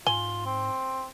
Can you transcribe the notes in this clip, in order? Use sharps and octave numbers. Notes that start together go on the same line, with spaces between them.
G#2 F4 G#5 G7
C4